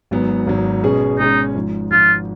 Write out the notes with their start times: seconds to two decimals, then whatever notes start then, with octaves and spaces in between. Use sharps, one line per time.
0.11 G#1 G#2 F#3 B3
0.47 G#1 G#2 F#3 B3
0.83 B2 G#3 C#4 G#4
1.19 B2 G#3 C#4 D#4 G#4
1.55 G#1 G#2 F3
1.91 G#1 G#2 F3 F4